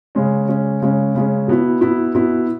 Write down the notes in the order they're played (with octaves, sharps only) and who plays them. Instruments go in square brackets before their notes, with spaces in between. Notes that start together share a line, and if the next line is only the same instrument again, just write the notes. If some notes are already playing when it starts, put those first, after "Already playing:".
[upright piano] C#3 G#3 C#4
C#3 G#3 C#4
C#3 G#3 C#4
C#3 G#3 C#4
B2 B3 E4
B2 B3 E4
B2 B3 E4